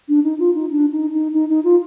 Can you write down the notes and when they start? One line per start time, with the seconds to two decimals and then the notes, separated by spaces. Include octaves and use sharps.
0.09 D4
0.24 D#4
0.39 F4
0.55 D#4
0.71 D4
0.92 D#4
1.13 D#4
1.34 D#4
1.49 D#4
1.64 F4